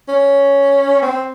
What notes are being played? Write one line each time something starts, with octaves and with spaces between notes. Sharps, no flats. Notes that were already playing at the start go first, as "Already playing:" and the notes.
C#4
C4